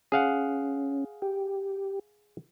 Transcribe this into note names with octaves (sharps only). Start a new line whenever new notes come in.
C#4 G#4 F5 F#5
G4